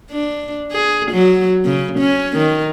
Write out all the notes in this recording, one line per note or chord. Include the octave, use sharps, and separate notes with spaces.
D4
G#4
F#3
C#3
C#4
D#3